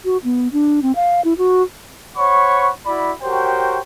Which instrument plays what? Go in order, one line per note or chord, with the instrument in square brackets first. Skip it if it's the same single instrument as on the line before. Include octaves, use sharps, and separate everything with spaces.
[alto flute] F#4
B3
D4
C4
F5
E4
F#4
[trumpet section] C5 C#5 F#5 B5 C#6
E4 F#4 D5 B5
F#4 G4 A#4 C5 C#5 G5